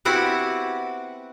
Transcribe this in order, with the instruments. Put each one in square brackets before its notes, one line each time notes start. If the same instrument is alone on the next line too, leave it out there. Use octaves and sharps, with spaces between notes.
[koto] B3 C4 E4 F#4 G4